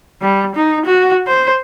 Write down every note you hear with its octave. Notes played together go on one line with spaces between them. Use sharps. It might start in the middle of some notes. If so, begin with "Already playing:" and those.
G3
D#4
F#4
C5